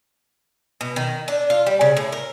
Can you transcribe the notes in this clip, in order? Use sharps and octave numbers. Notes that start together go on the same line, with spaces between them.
B2
D#3
D4
F4
G3
C#3
A2
A#4